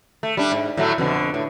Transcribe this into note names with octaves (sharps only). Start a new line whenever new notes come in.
A3
G3 D4
G#2
A2 F#3 A3
F2 B2 D3
A2